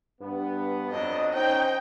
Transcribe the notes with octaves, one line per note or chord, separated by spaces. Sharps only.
G2 B3
F2 F#3 D4 D#5
C#4 D#4 C5 G5